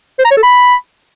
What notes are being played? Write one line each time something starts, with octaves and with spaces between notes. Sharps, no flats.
C5
A#5
C#5
A4
B5